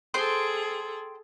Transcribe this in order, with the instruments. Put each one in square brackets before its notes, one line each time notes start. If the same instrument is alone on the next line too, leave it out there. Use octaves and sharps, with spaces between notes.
[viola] G#4 A4 [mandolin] C5 G5 C6